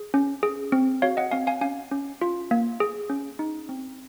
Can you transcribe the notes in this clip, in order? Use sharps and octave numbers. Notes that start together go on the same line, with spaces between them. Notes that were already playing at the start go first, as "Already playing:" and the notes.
Already playing: G#4
C#4
G#4
C4
F#4 C#5 F5
D#5 F#5
C4 F5 G#5
F5 G#5
C#4 F5 G#5
C#4
F4
A#3
G#4
C#4
D#4
C4